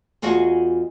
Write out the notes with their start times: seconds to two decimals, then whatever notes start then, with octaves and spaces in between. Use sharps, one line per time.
0.22 E2 F4 F#4 G#4 D#5